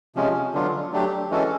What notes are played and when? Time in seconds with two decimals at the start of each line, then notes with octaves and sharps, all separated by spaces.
0.15 C3 F3 G#3 C#4
0.53 D3 F#3 B3 D4 F4
0.92 F#3 A3 D4 G4
1.30 E3 G#3 C#4 F#4 A4